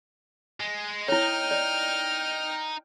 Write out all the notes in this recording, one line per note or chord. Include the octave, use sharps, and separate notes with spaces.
G#3
D#4 E4 C#5 G5 F6
D5